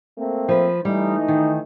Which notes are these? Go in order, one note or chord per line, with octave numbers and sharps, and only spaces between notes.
A3 A#3 C4
F3 B4
E3 G3 A3 D#4
D#3